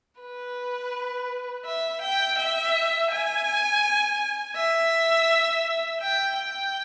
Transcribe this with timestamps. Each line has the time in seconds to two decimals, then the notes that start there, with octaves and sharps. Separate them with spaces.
0.21 B4
1.66 E5
2.02 G5
2.39 E5
3.11 G#5
4.56 E5
6.01 G5
6.37 G5